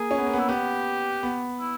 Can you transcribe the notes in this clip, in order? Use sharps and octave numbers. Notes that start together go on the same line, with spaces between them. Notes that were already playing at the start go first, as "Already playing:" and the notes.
Already playing: A#3 G#4
C#4
B3
A#3
B3
E4
B3 G4
B3
E4